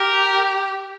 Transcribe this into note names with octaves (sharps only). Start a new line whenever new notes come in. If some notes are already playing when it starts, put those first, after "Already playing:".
Already playing: G4 A#4